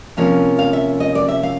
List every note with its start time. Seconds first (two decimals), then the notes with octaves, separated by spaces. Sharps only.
0.17 C3 F3 A#3 C#4 F5
0.59 F5
0.73 E5
1.00 D#5
1.15 D5
1.28 E5
1.43 F5